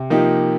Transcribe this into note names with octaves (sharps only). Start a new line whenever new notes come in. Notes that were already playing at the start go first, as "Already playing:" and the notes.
Already playing: C3
F3 A#3 D#4 G4